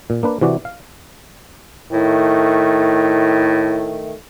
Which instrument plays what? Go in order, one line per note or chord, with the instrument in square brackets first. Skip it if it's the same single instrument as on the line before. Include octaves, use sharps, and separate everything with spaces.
[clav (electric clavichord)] A#2
A#3 D4 B4
C3 E3 F#4 D5
F5
[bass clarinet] A2 [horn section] D#3 A3